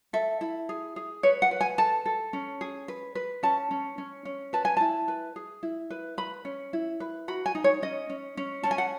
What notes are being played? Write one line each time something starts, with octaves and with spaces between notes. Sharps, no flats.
A4 E5
E4
G#4
G#4
B4 C#5
F#5
B4
G#5
A4 A5
A4
C#4
G#4
B4
B4
C#4 A5
C#4
C#4
C#4
B4 A5
G#5
E4 A5
B4
G#4
E4
B4
B4 B5
C#4
E4
B4
F#4 B5
G#5
D#4
C#5
C#4 D#5
C#4
C#4
C#4 A5
G#5
F#5